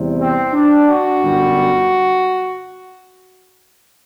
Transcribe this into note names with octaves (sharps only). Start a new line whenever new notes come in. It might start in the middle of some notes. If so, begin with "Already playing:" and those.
Already playing: E2 C3 G3
C4
D4
F#4
G1 F#2 D3 G3